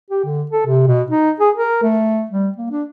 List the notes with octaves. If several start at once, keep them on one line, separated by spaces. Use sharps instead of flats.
G4
D3
A4
C3
B2
D#4
G#4
A#4
A3
G3
A#3
D4